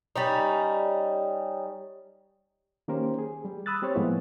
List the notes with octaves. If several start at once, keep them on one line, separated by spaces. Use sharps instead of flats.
G3 C#4 D#4
D#3 A#3 C#4 G4 A#4 C5
G#4
G3
B5 D#6 E6 F#6 A6
G3 C4 G4 C5 C#5
A2 F3 G#3 A#3 B3 E4